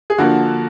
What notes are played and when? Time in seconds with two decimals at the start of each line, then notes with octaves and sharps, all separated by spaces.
0.10 G#4
0.18 D3 F3 A#3 F#4